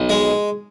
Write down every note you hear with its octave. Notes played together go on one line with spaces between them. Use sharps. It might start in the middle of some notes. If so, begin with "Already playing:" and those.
Already playing: B1
G#3